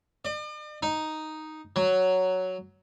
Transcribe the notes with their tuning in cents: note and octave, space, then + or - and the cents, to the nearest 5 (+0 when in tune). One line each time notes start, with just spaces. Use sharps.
D5 +45
D#4 +0
F#3 +5